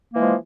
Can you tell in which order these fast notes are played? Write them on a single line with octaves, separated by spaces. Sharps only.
A#3 E3 G#3 F3